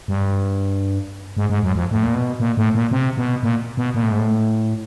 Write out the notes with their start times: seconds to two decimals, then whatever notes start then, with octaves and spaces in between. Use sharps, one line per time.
0.08 G2
1.37 G#2
1.50 G#2
1.63 F#2
1.75 F2
1.91 A2
2.03 A#2
2.14 B2
2.40 A#2
2.57 A2
2.75 A#2
2.91 C3
3.17 B2
3.43 A#2
3.77 B2
3.94 A#2
4.02 A2
4.11 G#2
4.19 A2